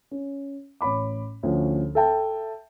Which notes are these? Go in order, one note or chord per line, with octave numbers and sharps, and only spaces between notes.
C#4
A1 C#5 B5 D6
D2 F3 C#4
A4 E5 G5 A5